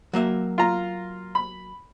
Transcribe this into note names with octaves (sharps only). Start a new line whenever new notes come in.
F#3 A#3 E5
F4 A#5
B5